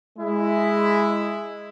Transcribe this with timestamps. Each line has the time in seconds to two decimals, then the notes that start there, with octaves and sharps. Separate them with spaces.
0.18 G#3 E4